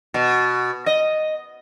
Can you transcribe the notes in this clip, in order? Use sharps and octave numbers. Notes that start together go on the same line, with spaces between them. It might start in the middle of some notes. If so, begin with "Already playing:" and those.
B2
D#5